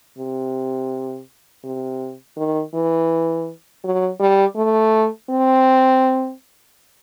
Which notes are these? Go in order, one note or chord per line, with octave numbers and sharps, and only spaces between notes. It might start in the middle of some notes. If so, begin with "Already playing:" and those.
C3
C3
D#3
E3
F#3
G3
A3
C4